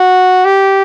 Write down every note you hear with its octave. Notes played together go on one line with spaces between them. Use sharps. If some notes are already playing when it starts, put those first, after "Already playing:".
Already playing: F#4
G4